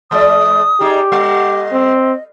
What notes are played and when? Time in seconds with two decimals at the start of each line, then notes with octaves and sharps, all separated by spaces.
0.11 E3 G#3 D5 D#6
0.80 G3 D#4 G4 G#4
1.12 G3 D#5
1.72 C4